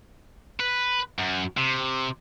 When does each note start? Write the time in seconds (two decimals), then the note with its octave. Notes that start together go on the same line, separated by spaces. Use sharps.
0.60 B4
1.19 F#2
1.57 C3